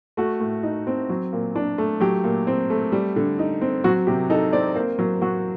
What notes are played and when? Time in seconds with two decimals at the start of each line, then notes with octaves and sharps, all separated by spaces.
0.17 A3 F#4
0.40 A2
0.63 D#4
0.87 C4
1.10 F#3
1.33 A#2
1.56 D4
1.78 A3
2.01 F#3 G4
2.24 A#2
2.47 C4
2.70 A3
2.92 G3
3.16 D3
3.39 D#4
3.61 C4
3.84 F#3 F#4
4.07 C3 G4
4.30 D#4 A4
4.53 C4 D5
4.75 A#3 C5
4.99 F#3
5.22 F#3 F#4